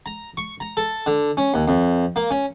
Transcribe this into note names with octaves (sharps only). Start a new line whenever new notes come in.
A#5
C#6
A#5
A4
D3
C#4
D#2
F2
A#3
C#4